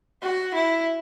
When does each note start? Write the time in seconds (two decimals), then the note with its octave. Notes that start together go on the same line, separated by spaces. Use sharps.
0.23 F#4
0.54 E4